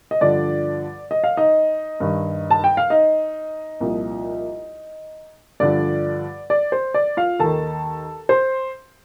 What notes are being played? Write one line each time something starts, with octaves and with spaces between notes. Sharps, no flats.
D#5
G2 D3 F3 D5
D#5
F5
D#4 D#5
G2 D#3
A5
G5
F5
D#4 D#5
C2 A#2 F3
G2 D3 F3 D5
D5
C5
D5
F4 F5
D#2 D#3 A4 A5
C5 C6